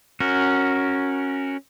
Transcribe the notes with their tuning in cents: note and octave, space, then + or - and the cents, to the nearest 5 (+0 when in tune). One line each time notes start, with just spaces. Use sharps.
C#4 -10 F#4 +0 A#4 +0